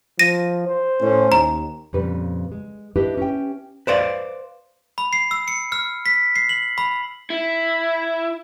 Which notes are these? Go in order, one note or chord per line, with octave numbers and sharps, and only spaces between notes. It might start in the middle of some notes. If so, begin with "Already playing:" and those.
F3 A#6 D#7
C5
A2 C#4
D#2 A#5
F2 A#2 C#3 G3 B4
G#3
D4 E4 G4 B4 D#5
C#4 G4 G5
B4 C5 D5 F5
B5
C7
E6
C#7
F6
B6
C7
F#7
B5
E4